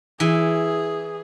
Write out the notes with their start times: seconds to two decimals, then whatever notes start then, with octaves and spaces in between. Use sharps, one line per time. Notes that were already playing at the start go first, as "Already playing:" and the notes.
0.20 E3 G#4